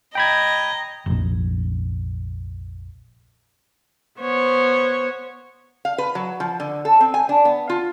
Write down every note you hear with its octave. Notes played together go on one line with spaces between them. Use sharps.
D#5 G5 A#5 B5 G#6
F1 A#1
B3 C5 C#5
F5
B4
F#3
F3
D3
A4
C4
G#5
D4
B3
F4